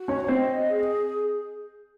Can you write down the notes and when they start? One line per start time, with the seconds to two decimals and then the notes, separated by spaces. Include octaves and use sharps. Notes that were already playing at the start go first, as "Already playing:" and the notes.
Already playing: F#4
0.08 C#4 C#5
0.24 C#5
0.28 C4 C5 D#5
0.69 G#4